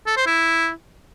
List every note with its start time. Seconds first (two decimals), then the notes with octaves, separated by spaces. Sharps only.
0.07 A4
0.17 C5
0.26 E4